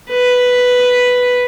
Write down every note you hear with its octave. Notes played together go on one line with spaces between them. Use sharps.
B4